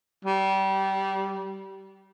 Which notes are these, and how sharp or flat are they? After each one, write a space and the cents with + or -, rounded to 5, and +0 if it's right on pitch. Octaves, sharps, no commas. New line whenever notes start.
G3 -25